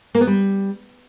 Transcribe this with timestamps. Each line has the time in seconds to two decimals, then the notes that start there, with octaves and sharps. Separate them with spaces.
0.15 A#3
0.21 B3
0.27 G3